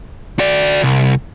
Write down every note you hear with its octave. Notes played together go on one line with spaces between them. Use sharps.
F#4 D5
C2